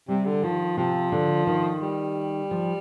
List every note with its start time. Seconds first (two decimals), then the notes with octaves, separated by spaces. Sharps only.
0.08 C3 G3
0.26 D3
0.43 D#3 F3
0.77 C3 F3
1.12 D3
1.47 D#3
1.81 G3
2.51 F3